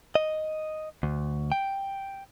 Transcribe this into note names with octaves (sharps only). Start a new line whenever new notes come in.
D#5
D2
G5